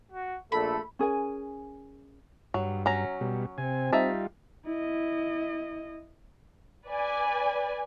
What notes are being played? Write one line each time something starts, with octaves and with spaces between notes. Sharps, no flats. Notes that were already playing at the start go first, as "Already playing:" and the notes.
F#4
A#1 A#2 A3 A4 B5
C#4 G#4 A#4 G#5
G2 F#3
F#3 C#4 A#5
B2 G3
C3 C4 G#5
G3 D#4 F4 E5 A5
E4 D#5
B4 D5 G#5